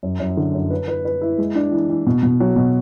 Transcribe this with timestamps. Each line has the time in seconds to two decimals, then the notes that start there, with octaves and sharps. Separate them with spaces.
0.03 F#2
0.20 F#2
0.37 D3
0.54 F#2
0.70 B4
0.88 B4
1.05 B4
1.21 E4
1.38 G#3
1.55 D4
1.72 E3
1.89 E3
2.07 B2
2.23 B2
2.40 F#3
2.56 B2